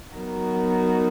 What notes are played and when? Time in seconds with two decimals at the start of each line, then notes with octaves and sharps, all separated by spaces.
0.16 F#3 B3 D#4 F#4 A#4